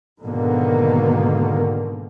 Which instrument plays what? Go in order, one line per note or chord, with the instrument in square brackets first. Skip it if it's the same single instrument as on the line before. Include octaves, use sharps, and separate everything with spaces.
[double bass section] G#2 B2 D3 D#3 A#3